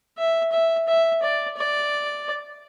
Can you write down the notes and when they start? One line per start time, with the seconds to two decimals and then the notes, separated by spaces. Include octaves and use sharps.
0.18 E5
0.52 E5
0.88 E5
1.23 D5
1.57 D5